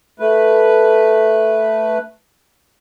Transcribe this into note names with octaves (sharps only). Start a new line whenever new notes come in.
A3 B4